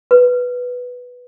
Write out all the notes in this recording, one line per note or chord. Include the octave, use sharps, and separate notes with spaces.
B4